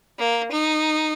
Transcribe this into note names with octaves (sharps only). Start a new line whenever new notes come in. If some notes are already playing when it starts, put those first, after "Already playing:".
A#3
D#4